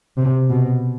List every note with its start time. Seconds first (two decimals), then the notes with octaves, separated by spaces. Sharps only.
0.17 C3
0.50 B2